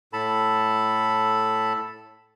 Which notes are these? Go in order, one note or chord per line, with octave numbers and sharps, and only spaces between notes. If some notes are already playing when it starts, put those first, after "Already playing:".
A2 A4 A5 B5